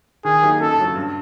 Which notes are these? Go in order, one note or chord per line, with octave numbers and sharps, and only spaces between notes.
D#3 G#4
F#3 A#3 D#4 G4
F#2 A4
C#3 F#3
G2